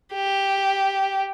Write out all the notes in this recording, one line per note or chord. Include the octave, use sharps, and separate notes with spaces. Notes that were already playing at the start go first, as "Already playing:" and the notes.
G4